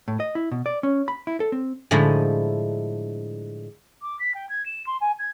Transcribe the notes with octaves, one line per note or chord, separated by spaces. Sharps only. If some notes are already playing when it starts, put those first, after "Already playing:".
A2
D#5
E4
B2
D5
C#4
B5
E4
A4
C4
A2 D3 F3 G#3 D#4 E4
D6
B6
G5
G#6
E7
C6
G#5
G#6